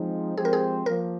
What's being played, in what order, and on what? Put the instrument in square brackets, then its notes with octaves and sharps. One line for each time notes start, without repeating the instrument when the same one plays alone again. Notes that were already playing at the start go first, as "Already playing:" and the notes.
Already playing: [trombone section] F3 G#3 C4 D#4
[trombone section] F3 G#3 C4 G4 C5 [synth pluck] G#4
[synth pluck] A#4
G#4
[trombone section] F3 A#3 [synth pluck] A#4